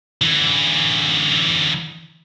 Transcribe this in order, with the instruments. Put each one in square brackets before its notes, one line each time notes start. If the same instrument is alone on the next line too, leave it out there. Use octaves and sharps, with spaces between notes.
[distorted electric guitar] D3 E3